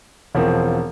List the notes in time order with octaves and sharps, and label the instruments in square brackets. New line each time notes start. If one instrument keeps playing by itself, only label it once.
[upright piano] E1 F3 C4